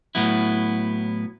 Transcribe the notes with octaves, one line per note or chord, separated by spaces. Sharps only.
A2 F#3 B3 E4